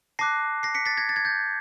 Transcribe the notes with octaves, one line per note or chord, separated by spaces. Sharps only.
A5 D6 F#6 A#6 C7
A#6 C7
B6 C#7
A6 B6
G#6 A#6
A6
G#6
G6 A6